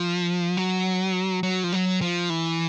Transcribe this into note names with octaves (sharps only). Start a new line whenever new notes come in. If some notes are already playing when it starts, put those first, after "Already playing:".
Already playing: F3
F#3
F#3
F3
F#3
F3
E3